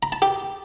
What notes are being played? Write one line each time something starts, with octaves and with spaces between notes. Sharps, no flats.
A#5
A5
G4